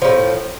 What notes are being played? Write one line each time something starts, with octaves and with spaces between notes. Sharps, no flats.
A2 C#3 F3